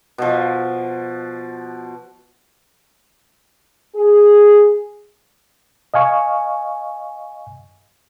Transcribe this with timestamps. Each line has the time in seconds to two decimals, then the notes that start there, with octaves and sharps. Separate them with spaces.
0.18 B2 F3
3.96 G#4
5.94 D#5 F5 G#5 C#6